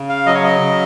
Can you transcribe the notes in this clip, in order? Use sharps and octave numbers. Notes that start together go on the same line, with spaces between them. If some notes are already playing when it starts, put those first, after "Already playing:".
Already playing: C#3
F5
F#3 D#5
C#5
D#5
C#3